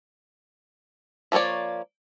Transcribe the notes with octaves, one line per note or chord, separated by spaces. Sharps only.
F3 A#3 F4 C#5 D5